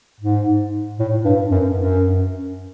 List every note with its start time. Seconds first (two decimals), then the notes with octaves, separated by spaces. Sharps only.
0.20 G#2
0.99 A2
1.24 G2
1.51 F#2
1.78 F#2